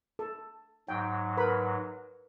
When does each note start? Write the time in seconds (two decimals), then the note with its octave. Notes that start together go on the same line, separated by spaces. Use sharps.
0.19 A4
0.89 G#2 F#3 G5
1.37 A#4 B4 B5